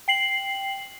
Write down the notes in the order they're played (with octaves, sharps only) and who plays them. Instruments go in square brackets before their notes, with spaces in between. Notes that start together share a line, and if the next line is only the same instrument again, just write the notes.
[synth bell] G5 C7 F#7